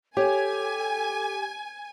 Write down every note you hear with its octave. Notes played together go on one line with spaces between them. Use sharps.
G4 A4 C#5 G#5